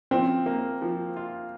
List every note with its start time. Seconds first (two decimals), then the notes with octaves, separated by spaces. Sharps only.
0.11 F3 C4
0.46 A#3
0.82 F3
1.17 F4